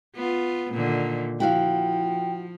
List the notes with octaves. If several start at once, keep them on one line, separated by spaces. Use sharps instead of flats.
B3 F4
A#2 D3 D#3
F3 E4 F#4 F5 G5